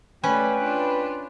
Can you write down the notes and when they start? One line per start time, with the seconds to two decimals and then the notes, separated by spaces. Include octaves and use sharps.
0.24 G3 A3 C#4 B4 G5
0.62 D4 F4